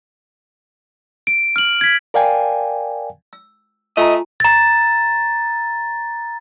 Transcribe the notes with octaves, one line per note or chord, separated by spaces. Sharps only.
D7
F6 F#7
G#6 B6
A#4 D5 F5 G5 G#5
E6
A3 F4 D#5 G#5 A#5
A#5 A6